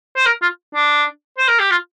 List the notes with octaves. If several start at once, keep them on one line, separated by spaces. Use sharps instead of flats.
C5
A#4
F4
D4
C5
A#4
G4
F4